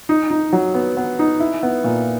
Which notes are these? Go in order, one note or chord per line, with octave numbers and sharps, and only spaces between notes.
D#4
D#4
F#3
B3
B3
D#4
E4
B3
A#2